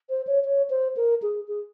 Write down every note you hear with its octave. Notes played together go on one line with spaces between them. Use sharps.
C5
C#5
C#5
C5
A#4
G#4
G#4